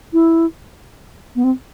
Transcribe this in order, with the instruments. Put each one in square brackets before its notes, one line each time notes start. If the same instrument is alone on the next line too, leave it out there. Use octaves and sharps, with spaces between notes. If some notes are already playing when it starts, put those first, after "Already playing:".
[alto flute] E4
B3
C4